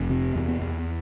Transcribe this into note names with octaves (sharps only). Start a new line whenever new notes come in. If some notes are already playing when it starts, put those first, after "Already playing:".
Already playing: F1
C3 C4
E2
B3
E2